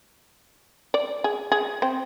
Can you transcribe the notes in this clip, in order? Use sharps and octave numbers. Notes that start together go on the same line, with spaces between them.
D5
G#4
G#4
C4